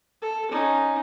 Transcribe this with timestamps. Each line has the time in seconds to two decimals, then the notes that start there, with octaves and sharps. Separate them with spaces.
0.22 A4
0.51 C#4 D#4